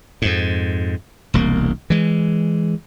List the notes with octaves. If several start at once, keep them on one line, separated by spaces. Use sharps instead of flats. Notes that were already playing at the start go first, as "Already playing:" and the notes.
F2 G#2
E1 C2 A#3
E3 G#3